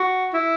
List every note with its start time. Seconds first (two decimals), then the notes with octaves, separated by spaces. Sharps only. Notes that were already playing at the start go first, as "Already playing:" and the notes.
Already playing: F#4
0.33 E4